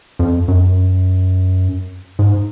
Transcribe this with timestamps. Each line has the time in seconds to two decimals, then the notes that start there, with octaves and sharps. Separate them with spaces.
0.19 F2
0.48 F#2
2.19 G#2